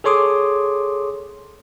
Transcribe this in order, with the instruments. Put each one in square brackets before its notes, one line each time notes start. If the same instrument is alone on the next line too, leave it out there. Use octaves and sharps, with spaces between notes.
[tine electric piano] G#4 A4 C#5 C6 D6 D#6